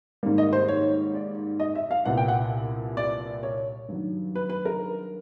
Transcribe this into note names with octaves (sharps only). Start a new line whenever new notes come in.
G#2 D#3 G3 A#3
D#5
C5
C#5
D5
D#5
E5
F5
C2 A#2 G3 B3 F#5
G5
F#5
D5
C#5
G2 D#3 F#3
B4
B4
A#4